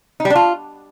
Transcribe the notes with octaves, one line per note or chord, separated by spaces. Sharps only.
D#4
G3
D4
F4